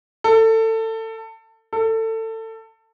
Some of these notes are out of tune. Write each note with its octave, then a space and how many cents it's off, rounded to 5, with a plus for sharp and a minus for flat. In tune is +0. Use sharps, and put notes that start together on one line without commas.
A4 +25
A4 +25